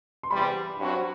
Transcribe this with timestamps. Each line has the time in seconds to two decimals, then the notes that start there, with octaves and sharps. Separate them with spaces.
0.23 C6
0.30 E2 C3 E3 G3 B5
0.77 G2 F#3 C4 F#4